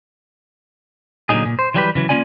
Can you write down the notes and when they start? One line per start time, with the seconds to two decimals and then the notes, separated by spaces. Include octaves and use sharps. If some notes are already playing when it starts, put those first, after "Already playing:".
1.29 A#2 D3 F3 F#3 D#4 G#4
1.45 A#2
1.59 C5
1.74 E3 F#3 G3 F4 G4 B4
1.95 C#3 E3 F#3
2.09 A#3 C4 C#4 F4 D5 G#5